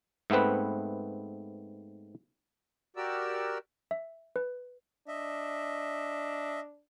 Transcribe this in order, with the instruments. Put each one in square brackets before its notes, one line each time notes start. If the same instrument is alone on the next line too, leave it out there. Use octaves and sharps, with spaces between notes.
[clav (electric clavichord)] G#2 A3 B3 C4 B4
[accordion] F#4 G4 A#4 D5 E6
[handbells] E5
B4
[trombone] D4 [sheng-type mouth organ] D#5 E5